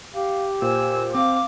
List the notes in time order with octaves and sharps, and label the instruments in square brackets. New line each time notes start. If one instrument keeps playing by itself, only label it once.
[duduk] G4 [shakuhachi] F5
[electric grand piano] A#2 [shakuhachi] C5 [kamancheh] G#5 E6
[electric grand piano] C4 [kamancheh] F5 D6